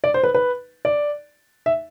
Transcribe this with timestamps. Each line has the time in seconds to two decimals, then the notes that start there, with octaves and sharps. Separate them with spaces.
0.04 D5
0.14 C5
0.23 B4
0.34 B4
0.85 D5
1.66 E5